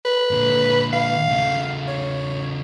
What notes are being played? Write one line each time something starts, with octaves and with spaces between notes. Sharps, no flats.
B4
A#2 D3
F5
C#3 A3
C#5